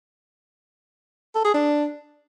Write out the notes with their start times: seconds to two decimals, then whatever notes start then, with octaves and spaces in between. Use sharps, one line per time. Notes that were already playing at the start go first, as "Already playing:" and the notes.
1.35 A4
1.45 G#4
1.54 D4